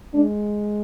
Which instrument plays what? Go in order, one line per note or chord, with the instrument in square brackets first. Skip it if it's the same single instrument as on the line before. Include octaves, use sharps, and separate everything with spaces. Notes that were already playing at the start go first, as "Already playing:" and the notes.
[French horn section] G#3 D4